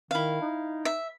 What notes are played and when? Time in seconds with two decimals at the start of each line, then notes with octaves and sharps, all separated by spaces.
0.11 D#3 E4 F5
0.41 D#4
0.85 E5